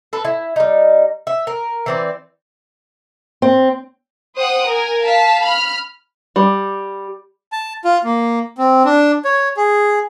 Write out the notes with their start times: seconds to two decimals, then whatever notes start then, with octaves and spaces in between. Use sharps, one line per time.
0.13 A4 B4
0.25 E4
0.56 G3 D#4
1.27 E5
1.47 A#4
1.86 E3 C4 D5
3.42 C4
4.37 C5 F#5 G5 D#6 F#6
4.67 A#4 G#5
5.03 F5 A5 B6
5.44 B5 F6
6.36 G3
7.52 A5
7.85 F4
8.04 A#3
8.58 C4
8.85 D4
9.25 C#5
9.57 G#4